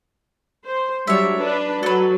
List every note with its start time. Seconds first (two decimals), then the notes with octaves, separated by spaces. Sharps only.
0.66 C5
1.07 F#3 G3 D4 C#5 E5
1.39 D4 B4
1.83 F#3 A4 B4